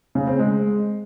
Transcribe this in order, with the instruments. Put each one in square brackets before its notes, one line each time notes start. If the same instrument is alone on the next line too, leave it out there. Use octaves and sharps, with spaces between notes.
[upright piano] C#3
C4
G#3